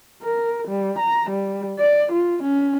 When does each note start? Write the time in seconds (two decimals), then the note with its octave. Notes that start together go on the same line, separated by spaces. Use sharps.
0.22 A#4
0.68 G3
0.99 A#5
1.30 G3
1.79 D5
2.12 F4
2.43 C#4